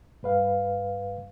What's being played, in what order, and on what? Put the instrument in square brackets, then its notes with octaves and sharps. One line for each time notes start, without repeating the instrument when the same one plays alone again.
[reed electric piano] G2 B4 F5